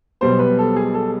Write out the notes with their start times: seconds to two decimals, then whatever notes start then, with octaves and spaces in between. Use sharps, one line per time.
0.21 B1 B2 G3 B3 C5
0.39 B4
0.59 A4
0.76 G#4
0.94 A4